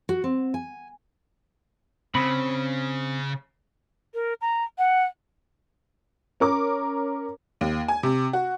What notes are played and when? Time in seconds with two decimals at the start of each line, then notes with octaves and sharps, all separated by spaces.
0.09 F#4
0.24 C4
0.54 G#5
2.15 C#3 C4 B5
4.13 A#4
4.41 A#5
4.78 F#5
6.40 C#4 A#4 D6
7.61 D#2
7.88 G#5
8.03 C3
8.33 F#4